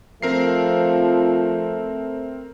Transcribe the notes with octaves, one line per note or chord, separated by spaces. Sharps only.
F3 A3 C4 A#4 C7